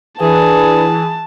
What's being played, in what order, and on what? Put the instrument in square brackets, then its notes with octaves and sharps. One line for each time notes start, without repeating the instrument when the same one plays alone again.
[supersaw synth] E3 [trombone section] D4 B4 [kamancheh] G#4 [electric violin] A5